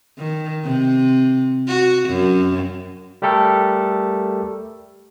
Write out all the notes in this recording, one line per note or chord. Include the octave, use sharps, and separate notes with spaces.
D#3
C3
F#4
F#2
G3 A3 G4 A4 A#4